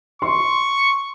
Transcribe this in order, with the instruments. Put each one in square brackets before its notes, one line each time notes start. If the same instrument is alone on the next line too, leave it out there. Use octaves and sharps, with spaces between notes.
[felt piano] C6 [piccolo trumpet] C#6